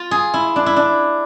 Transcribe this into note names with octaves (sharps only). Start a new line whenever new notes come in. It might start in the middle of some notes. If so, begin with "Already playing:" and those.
Already playing: F4
G#4
E4
D4
E4
D4